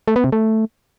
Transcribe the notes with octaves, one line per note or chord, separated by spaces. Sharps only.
A3
B3
C3
A3